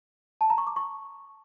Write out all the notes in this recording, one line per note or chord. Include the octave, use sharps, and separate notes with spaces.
A5
A#5
C#6
D6
C#6